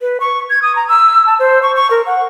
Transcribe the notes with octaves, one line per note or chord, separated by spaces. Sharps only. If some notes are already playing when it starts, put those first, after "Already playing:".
B4
C#6
G#6
D#6
A#5
E6
A5
C5
C#6
C#6
A#4
F#5